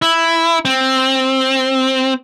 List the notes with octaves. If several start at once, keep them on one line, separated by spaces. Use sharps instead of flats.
E4
C4